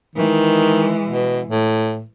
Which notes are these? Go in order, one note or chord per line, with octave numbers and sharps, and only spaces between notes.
D#3 E3 G#3
B2
A2